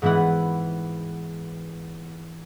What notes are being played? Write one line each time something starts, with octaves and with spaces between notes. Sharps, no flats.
G#2 E3 B3 E4 F#5